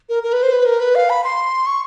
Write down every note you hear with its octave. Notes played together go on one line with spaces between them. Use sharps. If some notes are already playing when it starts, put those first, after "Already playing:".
A#4
A#4
B4
C5
B4
A#4
B4
F5
B5
C6
C#6